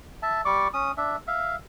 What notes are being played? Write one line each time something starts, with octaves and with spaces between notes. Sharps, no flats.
E5 A5
G3 D5 C#6 D6
C#4 D#6
D4 E5
E5 F5